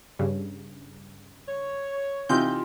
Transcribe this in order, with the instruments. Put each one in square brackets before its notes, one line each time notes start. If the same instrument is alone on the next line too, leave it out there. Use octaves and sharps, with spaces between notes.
[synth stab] G2 C#3
[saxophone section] C#5
[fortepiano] C3 E3 D#4 [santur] F4 G4 [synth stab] G6